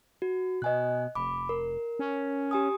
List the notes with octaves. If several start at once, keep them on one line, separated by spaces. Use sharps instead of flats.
F#4
B2 D#5 G#5 F#6
F1 B5 D6
A#4
C#4
G4 G#5 D#6